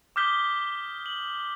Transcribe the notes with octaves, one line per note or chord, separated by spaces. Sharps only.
D6 D#6 F6 G6 B6 G7
F#7